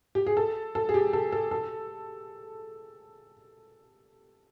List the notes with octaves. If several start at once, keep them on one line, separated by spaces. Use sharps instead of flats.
G4
G#4
A4
A4
G#4
G4
A4
A4
A4